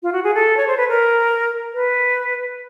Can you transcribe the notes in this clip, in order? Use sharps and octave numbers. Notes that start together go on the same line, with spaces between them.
F4
F#4
G#4
A4
C#5
C5
B4
A#4
B4